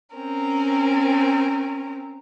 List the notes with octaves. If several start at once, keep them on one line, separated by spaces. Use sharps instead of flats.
C4 C#4 A#4